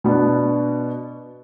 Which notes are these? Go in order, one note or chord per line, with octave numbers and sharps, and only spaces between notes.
B2 B3 D4